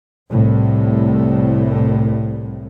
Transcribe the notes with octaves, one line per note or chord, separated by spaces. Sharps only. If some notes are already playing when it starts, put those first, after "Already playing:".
C2 A2